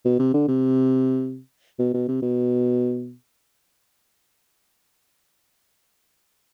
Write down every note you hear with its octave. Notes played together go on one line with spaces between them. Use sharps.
B2
C3
D3
C3
B2
B2
C3
B2